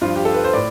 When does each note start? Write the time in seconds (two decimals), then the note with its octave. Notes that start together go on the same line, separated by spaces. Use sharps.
0.01 G2 F3 F4
0.16 G4
0.25 A4
0.34 B4
0.44 C5
0.53 A2 D5